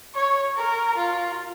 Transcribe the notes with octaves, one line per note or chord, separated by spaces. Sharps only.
C#5
A#4
F4